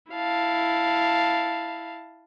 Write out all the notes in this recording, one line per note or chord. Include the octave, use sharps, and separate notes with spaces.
E4 F5 A5